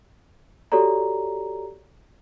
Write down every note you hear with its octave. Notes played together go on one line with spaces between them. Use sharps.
F#4 G4 A4 C#5 D5 A#5